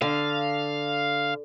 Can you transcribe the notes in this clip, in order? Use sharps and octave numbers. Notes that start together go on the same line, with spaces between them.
D3 F5